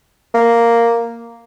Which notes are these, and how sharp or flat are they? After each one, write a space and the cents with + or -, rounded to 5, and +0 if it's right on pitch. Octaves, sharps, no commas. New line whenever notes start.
A#3 +0